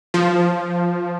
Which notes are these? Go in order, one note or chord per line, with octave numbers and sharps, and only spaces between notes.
F3